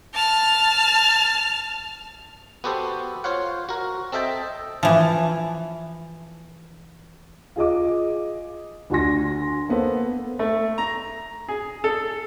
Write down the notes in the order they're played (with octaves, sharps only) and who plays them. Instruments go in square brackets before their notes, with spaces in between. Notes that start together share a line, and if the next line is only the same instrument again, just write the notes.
[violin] A5 F6
[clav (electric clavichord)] B3 F#4 G4 A4 C5
F4 C5 C#5 F5 F#5
F#4 A#4
C4 A4 D#5 E5 G5 A5
[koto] E3 F3
[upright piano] F4 G#4 D#5 D6
D2 D4 F#4 G#5 C6 A#6
A#3 B3 A4 C5
[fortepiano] A3
A#5
G#4
A4